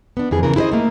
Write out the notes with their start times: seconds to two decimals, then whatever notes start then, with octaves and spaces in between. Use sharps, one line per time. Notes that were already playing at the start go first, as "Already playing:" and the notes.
0.17 B3 D4
0.31 F2 E3 G#4
0.43 C#3 E3 A#4
0.56 E4 G#4 B4 C5 D#5
0.72 A3 A#3